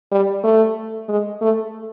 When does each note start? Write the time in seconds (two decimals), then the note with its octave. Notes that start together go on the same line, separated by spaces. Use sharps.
0.12 G3
0.44 A3
1.09 G#3
1.41 A3